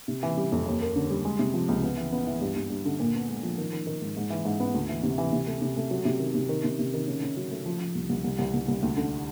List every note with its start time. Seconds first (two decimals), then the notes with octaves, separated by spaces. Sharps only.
0.08 C3
0.23 E3
0.37 G3
0.52 F2
0.66 D#2
0.81 A#3
0.96 D3
1.10 G3
1.25 G#3
1.39 C3
1.54 F3
1.69 C#2
1.83 B3
1.98 E3
2.12 B3
2.27 E3
2.41 G2
2.56 G2
2.70 G2
2.85 D3
3.00 A#2
3.14 B3
3.29 G#3
3.43 F3
3.58 D#3
3.73 D#3
3.87 D#3
4.02 G#2
4.17 G#2
4.30 E3
4.45 G#2
4.60 B3
4.74 D2
4.89 E3
5.03 C3
5.18 E3
5.33 C3
5.47 A3
5.62 C3
5.77 A3
5.91 F#3
6.05 C3
6.20 D#3
6.35 C3
6.49 D#3
6.64 C3
6.79 C3
6.94 D#3
7.07 C#3
7.22 C#3
7.37 F#3
7.51 A3
7.66 F3
7.81 F3
7.95 C2
8.09 C2
8.24 C2
8.38 C2
8.54 C2
8.68 C2
8.82 D2
8.97 D3